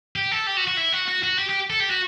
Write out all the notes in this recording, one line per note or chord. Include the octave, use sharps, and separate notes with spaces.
G4
A4
G4
F#4
F#4
E4
F#4
F#4
F#4
G4
G4
A4
G4
F#4